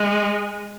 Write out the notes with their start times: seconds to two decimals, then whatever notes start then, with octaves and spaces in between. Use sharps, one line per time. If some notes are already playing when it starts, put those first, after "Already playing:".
Already playing: G#3